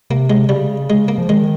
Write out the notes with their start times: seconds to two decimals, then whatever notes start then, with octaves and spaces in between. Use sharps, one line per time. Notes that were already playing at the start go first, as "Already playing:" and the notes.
0.10 C3 A#3
0.30 G#3
0.49 C#3 G3
0.90 G#3
1.08 A#3
1.18 F3
1.29 D#3 G#3